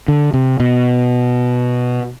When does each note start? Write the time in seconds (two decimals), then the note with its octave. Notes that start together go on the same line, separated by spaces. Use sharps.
0.08 D3
0.34 C3
0.60 B2